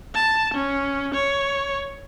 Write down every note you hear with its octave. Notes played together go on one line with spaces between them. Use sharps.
A5
C#4
C#5